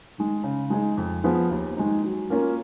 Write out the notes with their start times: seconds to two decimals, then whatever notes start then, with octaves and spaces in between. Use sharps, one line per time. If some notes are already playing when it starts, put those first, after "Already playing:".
0.18 D#3 G#3
0.44 C#3
0.70 G#3 D#4 G#4
0.97 F2
1.24 F3 B3 F4 G#4
1.51 D#2
1.77 D#3 G#3 D#4
2.04 F#3
2.30 A#3 C#4 F4 A#4